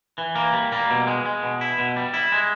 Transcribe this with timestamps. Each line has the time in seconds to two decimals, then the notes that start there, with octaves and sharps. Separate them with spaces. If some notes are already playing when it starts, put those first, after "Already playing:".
0.18 E3
0.35 A#3
0.53 G3
0.72 A#3
0.90 B2
1.07 G#3
1.26 G#3
1.43 B2
1.61 E4
1.78 B2
1.96 G3
2.14 E4
2.32 G#3